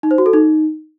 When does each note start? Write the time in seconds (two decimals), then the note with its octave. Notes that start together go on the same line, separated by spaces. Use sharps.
0.03 D#4
0.11 C5
0.18 F#4
0.26 A4
0.33 D#4